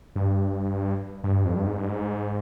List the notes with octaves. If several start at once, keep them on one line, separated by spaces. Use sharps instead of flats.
G2
G2
F2
G2
G#2
G2
G#2